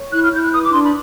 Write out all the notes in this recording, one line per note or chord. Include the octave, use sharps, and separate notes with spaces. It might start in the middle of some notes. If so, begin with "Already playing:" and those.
Already playing: C#5
E4 F#6
F6
E4 G6
F#6
B4 D#6
D6
D4 C6
B5